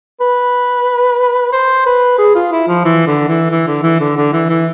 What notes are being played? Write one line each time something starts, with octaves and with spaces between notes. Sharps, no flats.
B4
C5
B4
G#4
F4
E4
F3
E3
D3
E3
E3
D3
E3
D3
D3
E3
E3